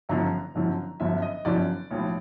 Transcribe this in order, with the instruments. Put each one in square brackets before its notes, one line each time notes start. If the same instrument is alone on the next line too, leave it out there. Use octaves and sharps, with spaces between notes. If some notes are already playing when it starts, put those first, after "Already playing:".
[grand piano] G1 F#2 D3 F3 A#5
G1 F#2 D3 F3
G1 F#2 D3 F3 E5
D#5
G1 F#2 D3 F3 D5
B1 A2 F3